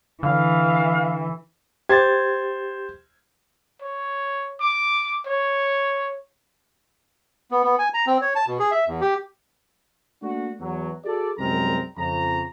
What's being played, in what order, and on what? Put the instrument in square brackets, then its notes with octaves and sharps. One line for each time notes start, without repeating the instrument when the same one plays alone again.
[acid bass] D3 [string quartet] E3 [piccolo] F5
[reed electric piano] G4 A6 [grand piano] C5 G#6
[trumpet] C#5
D6
C#5
[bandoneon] B3
B3
G#5
A#5
C4
C#5
A5
B2
G#4
E5
E2
G4
[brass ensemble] A3 A#3 D4 F#4
E2 F#3
F#4 G#4 A4 D5
C2 F#2 G#3 C4 A#4 A#5
F2 C#3 A#5